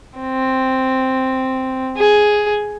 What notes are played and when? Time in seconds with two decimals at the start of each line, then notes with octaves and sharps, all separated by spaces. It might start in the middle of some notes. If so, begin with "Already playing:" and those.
0.19 C4
1.97 G#4